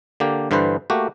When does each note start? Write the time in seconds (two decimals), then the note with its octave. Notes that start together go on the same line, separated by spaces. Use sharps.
0.20 D3 A#3 G4
0.51 G2 D3 E3 B4 C5
0.90 A3 A#3 F#4 G4